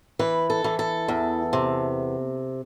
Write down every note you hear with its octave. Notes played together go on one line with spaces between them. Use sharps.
E3 B4
A4
E3
A4
E2
C3